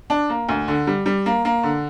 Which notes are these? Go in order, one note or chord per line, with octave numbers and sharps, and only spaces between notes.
D4
A#3
D2
D3
G3
G3
A#3
A#3
D3